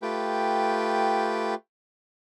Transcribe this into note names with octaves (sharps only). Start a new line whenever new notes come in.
A3 F4 G4 B4 G5